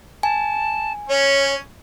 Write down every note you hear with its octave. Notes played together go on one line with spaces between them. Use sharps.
G#5 A5
C#4 C#5